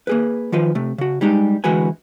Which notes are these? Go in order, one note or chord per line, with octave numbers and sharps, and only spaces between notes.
A#3 G#4 B4
D#3 F3 F4 B4
C3 A3
C#3 F#4
G3 G#3 D#4 G4
D2 E3 G#3 F#4 B4 G#5